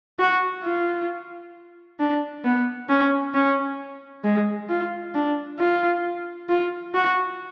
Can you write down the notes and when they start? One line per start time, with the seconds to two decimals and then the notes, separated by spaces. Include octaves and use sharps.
0.19 F#4
0.64 F4
1.99 D4
2.45 B3
2.89 C#4
3.34 C#4
4.24 G#3
4.69 F4
5.15 D4
5.59 F4
6.49 F4
6.94 F#4